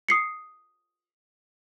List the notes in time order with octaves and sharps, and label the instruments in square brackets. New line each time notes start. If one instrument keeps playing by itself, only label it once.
[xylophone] D#6 C7 C#7